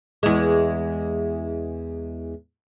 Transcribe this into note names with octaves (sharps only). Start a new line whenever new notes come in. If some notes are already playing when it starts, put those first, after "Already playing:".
E2 G#3